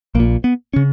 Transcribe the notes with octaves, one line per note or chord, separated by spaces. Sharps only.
A#1 A#2 A#3
B3
C#3 C#4